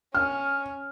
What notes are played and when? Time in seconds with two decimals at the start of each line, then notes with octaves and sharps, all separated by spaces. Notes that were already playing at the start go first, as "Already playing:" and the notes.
0.15 C#4 F6